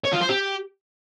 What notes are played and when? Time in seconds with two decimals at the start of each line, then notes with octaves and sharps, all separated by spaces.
0.04 C#5
0.12 F4
0.21 C5
0.29 G4